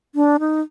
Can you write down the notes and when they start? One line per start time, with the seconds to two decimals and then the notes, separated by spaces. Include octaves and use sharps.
0.15 D4
0.40 D#4